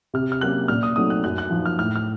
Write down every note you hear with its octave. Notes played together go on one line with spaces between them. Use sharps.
C3 F6
F6
F#3 A#3 C#4 F#6
A#2 F6
D#6
F#3 A3 C4 D#4 D#6
F#6
F#2 F#6
F#6
F3 A#3 D#4
F6
A2 F6
F6